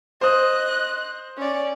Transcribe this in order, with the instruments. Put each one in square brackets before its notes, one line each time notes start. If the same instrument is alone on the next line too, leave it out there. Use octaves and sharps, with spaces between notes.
[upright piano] C5 D#6 [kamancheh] D#5 F#6
[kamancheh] C#4 D5